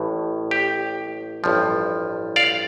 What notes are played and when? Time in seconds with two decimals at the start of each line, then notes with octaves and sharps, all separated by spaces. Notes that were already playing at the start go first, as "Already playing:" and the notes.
Already playing: A1 A2
0.51 G4
1.44 A1 G2 F3
2.36 D5 F5